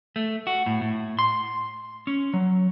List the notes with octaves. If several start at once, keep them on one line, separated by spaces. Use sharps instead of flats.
A3
F#4
A2
A2
C6
C#4
F#3